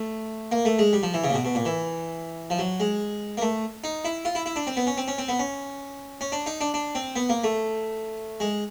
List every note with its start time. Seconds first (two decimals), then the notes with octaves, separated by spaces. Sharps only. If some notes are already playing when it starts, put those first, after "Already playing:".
Already playing: A3
0.52 A#3
0.65 A3
0.79 G#3
0.93 G3
1.03 F3
1.14 E3
1.24 C#3
1.30 A#2
1.34 B2
1.45 B2
1.55 A#2
1.65 E3
2.50 F3
2.59 F#3
2.80 G#3
3.37 A#3
3.42 A3
3.84 D#4
4.05 E4
4.25 F4
4.35 E4
4.46 E4
4.56 D4
4.67 C4
4.77 B3
4.87 C#4
4.97 C4
5.08 C#4
5.18 C4
5.28 B3
5.39 C#4
6.21 C#4
6.32 D4
6.46 D#4
6.61 D4
6.74 D4
6.95 C4
7.16 B3
7.29 A#3
7.44 A3
8.40 G#3